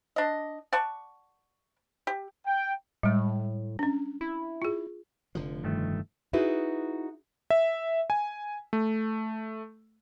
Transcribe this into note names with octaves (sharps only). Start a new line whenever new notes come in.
D4 D#5
D5 F#5 A5 C#6
G4
G5
A2 G3 G#3
C#4 D4
E4
F4 G#4
F1 D3 F3
G2 D#3 A3
D#4 E4 F#4 G#4 B4
E5
G#5
A3